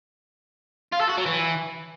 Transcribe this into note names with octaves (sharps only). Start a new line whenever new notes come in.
F4
A4
F#4
F#3
E3